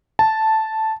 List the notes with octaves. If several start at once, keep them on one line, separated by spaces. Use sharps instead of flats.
A5